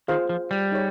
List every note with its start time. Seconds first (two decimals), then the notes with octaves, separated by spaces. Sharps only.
0.08 D#3 F4 G#4 C5 F5
0.29 F3
0.51 G3
0.72 D#4 G#4 C#5